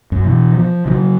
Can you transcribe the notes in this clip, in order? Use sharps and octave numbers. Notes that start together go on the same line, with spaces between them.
F#2
B2 E3
F3
C#3 E3 F#3